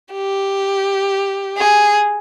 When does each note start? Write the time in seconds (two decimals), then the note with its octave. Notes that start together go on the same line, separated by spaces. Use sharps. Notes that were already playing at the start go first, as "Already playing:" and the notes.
0.13 G4
1.57 G#4